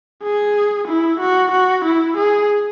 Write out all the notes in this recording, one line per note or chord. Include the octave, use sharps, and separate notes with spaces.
G#4
E4
F#4
F#4
E4
G#4